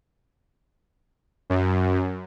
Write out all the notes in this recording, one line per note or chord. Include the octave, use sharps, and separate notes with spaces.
F#2